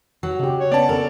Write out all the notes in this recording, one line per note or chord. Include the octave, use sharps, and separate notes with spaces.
F#3
C#3 G4
C#5
B3 C#4 D4 D5 A5
A4 A#4